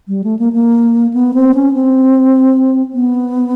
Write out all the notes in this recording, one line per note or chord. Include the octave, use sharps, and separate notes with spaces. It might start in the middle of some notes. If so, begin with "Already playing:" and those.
G3
A3
A#3
A#3
B3
C4
C#4
C4
B3